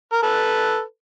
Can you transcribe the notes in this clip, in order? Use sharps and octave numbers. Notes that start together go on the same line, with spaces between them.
A#4
A4 B4